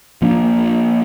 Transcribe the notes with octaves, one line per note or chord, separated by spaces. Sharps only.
F3 A#3 D4